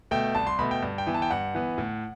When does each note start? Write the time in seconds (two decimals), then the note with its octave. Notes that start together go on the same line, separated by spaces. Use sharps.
0.11 B2 A3 G5
0.35 C2 A5
0.47 C6
0.59 B2 A3 B5
0.71 G5
0.82 G2
0.98 G5
1.07 E3 B3
1.14 A5
1.22 G5
1.30 G2 F#5
1.55 E3 B3
1.78 A2